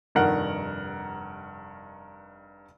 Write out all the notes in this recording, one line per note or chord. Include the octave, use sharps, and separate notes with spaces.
F1 G2 D#3 A#4 F#5